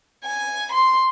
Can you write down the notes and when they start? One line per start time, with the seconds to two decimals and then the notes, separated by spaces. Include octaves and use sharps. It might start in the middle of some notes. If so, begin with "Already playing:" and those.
0.25 G#5
0.72 C6